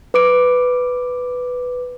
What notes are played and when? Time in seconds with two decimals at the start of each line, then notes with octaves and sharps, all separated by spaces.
0.14 B4 D6 D7